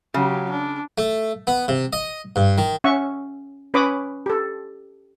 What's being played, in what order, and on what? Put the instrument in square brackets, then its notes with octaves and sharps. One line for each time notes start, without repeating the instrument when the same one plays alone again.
[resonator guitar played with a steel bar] C#3 [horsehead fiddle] F#3 G4
[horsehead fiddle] D4
[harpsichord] A3
B3
C3
D#5
G2
D#3
[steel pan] C#4 E5 F#5 C#6
C#4 B4 C#5 B5 D6 D#6
G4 A4